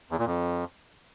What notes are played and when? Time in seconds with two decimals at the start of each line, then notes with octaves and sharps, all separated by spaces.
0.11 E2
0.19 A#2
0.26 F2